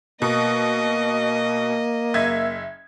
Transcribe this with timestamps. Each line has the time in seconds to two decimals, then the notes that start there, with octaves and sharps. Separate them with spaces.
0.22 B2 A#3 D#5
2.14 F#1 E5 G#6